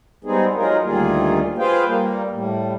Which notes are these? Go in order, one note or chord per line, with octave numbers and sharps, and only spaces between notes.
G3 G#3 B3 C4 D#4 G#4
F#3 G#3 D#4 F4 G#4 A#4
D2 D#3 G3 A#3 F4 G#4
F4 G#4 B4 C5 F5 G5
G3 A#3
A2 G3